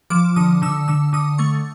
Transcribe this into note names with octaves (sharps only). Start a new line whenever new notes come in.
F3 D6
D3 D#6
D3 E6
D3 E6
D3 D#6
A3 C#6